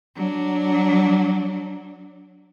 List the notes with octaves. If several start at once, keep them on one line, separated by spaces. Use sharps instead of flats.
F#3 D4